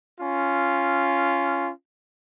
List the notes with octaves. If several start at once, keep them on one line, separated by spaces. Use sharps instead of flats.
C#4 F4